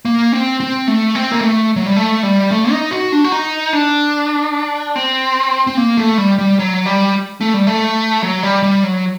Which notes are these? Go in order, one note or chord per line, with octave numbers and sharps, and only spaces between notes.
A#3
C4
C4
A3
C4
A#3
A3
F#3
G3
A3
G3
A3
D#4
F#4
D4
F#4
D#4
D4
C4
C4
A#3
A3
G3
G3
F#3
G3
A3
G3
A3
F#3
G3
G3
F#3